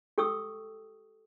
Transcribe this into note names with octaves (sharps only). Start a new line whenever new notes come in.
G4 A4 G5 C#6 D#6 E6